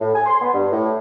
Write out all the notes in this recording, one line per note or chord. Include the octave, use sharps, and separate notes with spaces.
A2
G#5
C6
B3
G2
A2